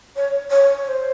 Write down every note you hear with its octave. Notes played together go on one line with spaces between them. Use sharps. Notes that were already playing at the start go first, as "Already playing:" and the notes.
C#5
C#5
C#5
C5